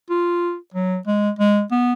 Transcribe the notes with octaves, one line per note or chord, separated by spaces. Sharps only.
F4
F#3
G#3
G#3
B3